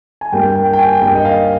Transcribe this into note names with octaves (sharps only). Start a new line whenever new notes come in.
G#5
G2 G3 A#3 G5
G5
G5
G#5
G2 G3 A#3 G5
D#5
F5